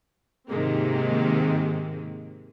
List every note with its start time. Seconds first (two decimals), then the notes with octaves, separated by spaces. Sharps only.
0.49 G#2 C3 D#3 G#3 A#3 C4